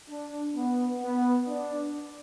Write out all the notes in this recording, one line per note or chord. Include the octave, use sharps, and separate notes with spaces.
D4
B3
B3
D4